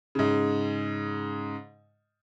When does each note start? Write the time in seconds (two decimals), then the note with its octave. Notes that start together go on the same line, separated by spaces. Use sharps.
0.15 G#2 C#3